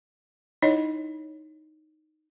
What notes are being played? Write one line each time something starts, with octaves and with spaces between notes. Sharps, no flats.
D#4 E4 C#5 D#5